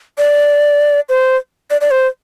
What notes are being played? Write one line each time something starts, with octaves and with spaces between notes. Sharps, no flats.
D5
C5
D5
D5
C5